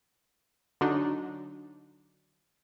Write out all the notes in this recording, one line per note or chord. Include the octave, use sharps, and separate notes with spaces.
D3 F#3 D4 D#4